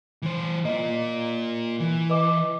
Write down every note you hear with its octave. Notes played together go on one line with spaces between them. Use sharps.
E3 C5
A#3 F4 D#5
E3
B4 D#5 D6